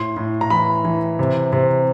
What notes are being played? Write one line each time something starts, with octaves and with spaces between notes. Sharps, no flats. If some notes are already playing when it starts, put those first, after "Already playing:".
Already playing: A2 C6
A2
A#5
E3 B5
E3
C3
C3